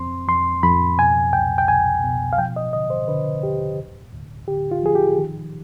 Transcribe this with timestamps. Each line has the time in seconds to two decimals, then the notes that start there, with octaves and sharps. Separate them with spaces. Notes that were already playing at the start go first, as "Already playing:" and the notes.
Already playing: F2 C4 C6
0.28 F2 C6
0.63 F2 B5
0.98 B2 G#5
1.33 C2 G5
1.58 G5
1.68 C2 G#5
2.03 B2
2.33 F5
2.38 F3 G5
2.56 D#5
2.73 D3 D#5
2.90 C5
3.08 D3 B4
3.43 D#2 G4
3.79 D2
4.13 D2
4.48 D3 G4
4.71 F4
4.83 F3 G#4
4.95 G4
5.18 D#3